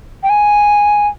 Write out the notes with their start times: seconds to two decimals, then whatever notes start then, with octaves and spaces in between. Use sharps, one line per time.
0.23 G5
0.30 G#5